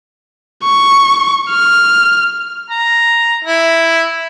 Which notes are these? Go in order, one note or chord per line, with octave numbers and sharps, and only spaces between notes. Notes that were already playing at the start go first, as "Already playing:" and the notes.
C#6
F6
A#5
E4